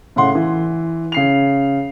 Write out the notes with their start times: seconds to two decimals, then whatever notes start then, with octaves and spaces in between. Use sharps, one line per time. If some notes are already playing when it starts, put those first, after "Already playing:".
0.16 A2 C#3 F#5 C6
0.35 E3
1.12 C#3 C7 F7